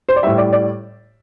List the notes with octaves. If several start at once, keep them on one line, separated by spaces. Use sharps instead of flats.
C5
D5
A2 G3 E5
D5
D5